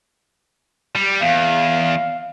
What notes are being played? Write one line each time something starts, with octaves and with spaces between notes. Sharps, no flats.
G3
E2 F5